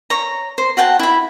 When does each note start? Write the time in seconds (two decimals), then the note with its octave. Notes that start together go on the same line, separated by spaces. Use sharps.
0.10 C#5 A#5
0.58 C5
0.77 F#4 F#5 G5 A5
0.99 E4 B5